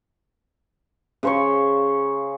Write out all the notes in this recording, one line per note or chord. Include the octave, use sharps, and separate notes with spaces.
C#3 C5 C#5